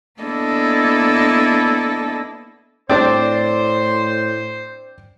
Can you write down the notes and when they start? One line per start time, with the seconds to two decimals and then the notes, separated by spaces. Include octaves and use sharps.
0.21 A#3 B3 D4 E4 A4 D#5
2.89 A2 C4 D4 C5 D5